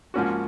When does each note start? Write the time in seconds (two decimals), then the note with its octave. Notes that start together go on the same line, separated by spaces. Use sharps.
0.14 G#2 F3 A#3 C#4 F#4